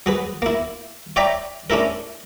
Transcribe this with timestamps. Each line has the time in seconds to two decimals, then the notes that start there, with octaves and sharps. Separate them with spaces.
0.06 F#3 G#4 B4
0.42 A#3 E4
1.16 C#5 D5 E5 G5 A#5 B5
1.70 C#4 D4 E4 A4 A#4